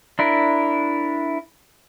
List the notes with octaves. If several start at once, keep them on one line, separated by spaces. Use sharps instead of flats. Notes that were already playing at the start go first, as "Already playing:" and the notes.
D4 E4 A#4